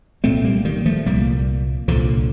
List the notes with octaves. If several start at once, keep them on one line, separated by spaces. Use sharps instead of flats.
C2 A#2 A3 C4
G3 A#3
D#3 G3
F3 A3
C2 A#2 G3 A#3
C2 A#2 D3 F3